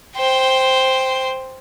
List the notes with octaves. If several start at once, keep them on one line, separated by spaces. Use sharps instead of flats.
C5 G5